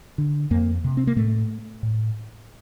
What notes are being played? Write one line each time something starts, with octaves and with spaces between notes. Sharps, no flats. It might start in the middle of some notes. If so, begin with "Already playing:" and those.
D3
F2 A#3
C3
C4
A#3
A2 A3
A2